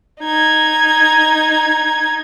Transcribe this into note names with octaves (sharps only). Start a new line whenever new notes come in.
D#4 G#6